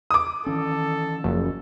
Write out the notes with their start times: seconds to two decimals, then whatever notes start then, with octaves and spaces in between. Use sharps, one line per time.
0.11 D6 D#6
0.46 D#3 E3 C#4 A4
1.24 F#1 F3